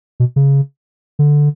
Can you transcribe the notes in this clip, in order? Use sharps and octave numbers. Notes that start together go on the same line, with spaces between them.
B2
C#3
D3